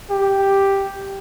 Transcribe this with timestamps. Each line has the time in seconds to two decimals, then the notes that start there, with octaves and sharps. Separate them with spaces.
0.10 G4